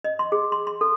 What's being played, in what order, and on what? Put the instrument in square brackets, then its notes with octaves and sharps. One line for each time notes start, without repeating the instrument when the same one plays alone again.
[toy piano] D#5
C6
G#4
C6
C6
A4